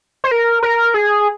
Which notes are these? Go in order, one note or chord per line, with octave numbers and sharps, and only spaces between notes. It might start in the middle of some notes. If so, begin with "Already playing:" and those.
C5
A#4
A#4
G#4